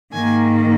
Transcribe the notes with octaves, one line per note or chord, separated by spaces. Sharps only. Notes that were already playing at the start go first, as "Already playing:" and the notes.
G#2 D#3 A#3 G#5